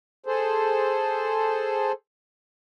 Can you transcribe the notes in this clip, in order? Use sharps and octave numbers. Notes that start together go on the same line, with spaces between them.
G#4 A4 C5